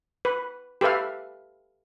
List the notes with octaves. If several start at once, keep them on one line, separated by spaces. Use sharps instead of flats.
B4
G4 A4 B4 E5 F5